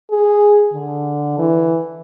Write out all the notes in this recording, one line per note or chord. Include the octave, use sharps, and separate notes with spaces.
G#4
D3
E3